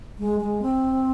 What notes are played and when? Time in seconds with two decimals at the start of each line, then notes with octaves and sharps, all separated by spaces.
0.19 G#3
0.40 G#3
0.62 C4